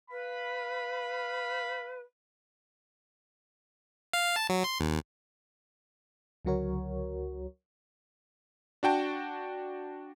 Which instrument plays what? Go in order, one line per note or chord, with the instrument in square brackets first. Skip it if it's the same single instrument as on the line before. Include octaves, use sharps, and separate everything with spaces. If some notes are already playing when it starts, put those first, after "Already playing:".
[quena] B4 [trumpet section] F5 B5
[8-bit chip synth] F5
A5
F#3
C6
D#2
[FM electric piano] C#2 D3 F#3 F#4 A#4 C#5
[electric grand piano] D4 F#4 G5 A5